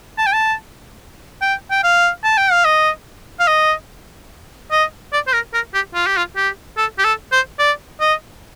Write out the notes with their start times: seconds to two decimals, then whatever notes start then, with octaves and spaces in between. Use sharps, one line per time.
0.18 A5
0.26 G5
0.33 A5
1.42 G5
1.71 G5
1.83 F5
2.24 A5
2.38 G5
2.52 F5
2.65 D#5
3.39 F5
3.47 D#5
4.71 D#5
5.13 D5
5.27 C5
5.33 A#4
5.53 A#4
5.74 G4
5.94 F4
6.06 G4
6.17 F4
6.36 G4
6.77 A4
6.98 G4
7.04 A4
7.32 C5
7.59 D5
8.01 D#5